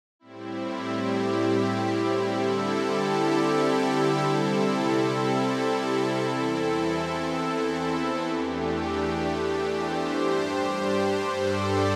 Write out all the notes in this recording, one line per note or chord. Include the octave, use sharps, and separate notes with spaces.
A2 G3 C4 E4
G4
D3 G3 C4 E4 A4
G4
E4
G4
C3 G3 C4 E4 A4
E4 A4
E2 E3 C4 E4 A4
E4
E2 E3 A3 D4 G4
G4 C5
G2 G3 D4
A4 D5